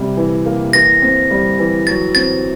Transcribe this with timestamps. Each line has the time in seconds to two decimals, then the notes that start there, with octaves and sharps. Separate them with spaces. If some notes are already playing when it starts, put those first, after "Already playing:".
Already playing: C3 G3
0.17 E3
0.46 A#3
0.73 E3 A#6
1.02 C4
1.31 G3
1.59 E3
1.87 F#3 A6
2.15 C4 A6